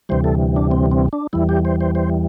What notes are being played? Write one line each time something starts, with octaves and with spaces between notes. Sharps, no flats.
D2 C3 E3 G3 C5
A4
D4
C4
C4
D4
E2 E3 G3 E4
G4
C5
C5
C5